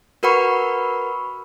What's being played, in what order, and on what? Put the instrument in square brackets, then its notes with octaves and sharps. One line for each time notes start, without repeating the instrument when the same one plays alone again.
[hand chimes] F#4 A#4 B4 F#5 B5 C#6